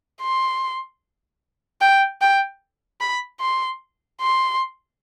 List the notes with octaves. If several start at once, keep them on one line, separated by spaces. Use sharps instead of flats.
C6
G5
G5
B5
C6
C6